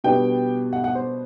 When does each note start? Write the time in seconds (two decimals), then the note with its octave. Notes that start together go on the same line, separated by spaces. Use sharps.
0.04 B2 G3 B3 D4 G5
0.73 F#5
0.84 F#5
0.95 C5